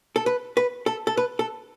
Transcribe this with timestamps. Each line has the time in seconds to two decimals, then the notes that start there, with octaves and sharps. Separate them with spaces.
0.16 A4
0.26 B4
0.57 B4
0.86 A4
1.07 A4
1.17 B4
1.39 A4